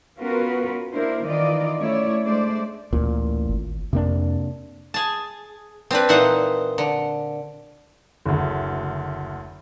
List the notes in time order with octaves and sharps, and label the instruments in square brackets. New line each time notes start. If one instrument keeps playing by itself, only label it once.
[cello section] B3 C#4 F4 F#4 A#4 B4
A#3 D4 E4 A#4 C5
D#3 E3 F4 D5 D#5
A3 C#4 E4 C#5 D5
G#3 A3 D4 C5 D5
[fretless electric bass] A1 A#2 [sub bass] D2
[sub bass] G#1
[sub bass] F2 [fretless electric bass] C3 A#3 D4
[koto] G#4 A5
C4 D4 B4
A#2 E3 D#4 C5 F#5
D3
[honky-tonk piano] F#1 D2